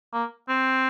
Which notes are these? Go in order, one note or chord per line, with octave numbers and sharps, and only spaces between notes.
A#3
C4